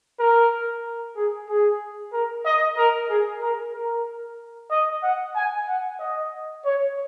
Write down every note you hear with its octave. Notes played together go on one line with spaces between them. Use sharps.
A#4
G#4
G#4
A#4
D#5
A#4
G#4
A#4
A#4
D#5
F#5
G#5
F#5
D#5
C#5